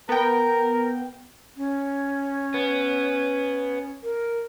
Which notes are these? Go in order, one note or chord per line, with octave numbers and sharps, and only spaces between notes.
B3 A#4 G5
C#4
B3
A#4